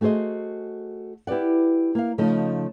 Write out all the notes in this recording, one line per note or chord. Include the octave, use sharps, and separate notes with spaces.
A3 F#4 G#4 C5 D#5
E4 G4 B4 D5 F#5
A#3 F5
C#3 F3 A3 D#4 D#5 A5